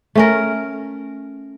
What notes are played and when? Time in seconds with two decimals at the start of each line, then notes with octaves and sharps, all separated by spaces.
0.15 A3 C#4 A#4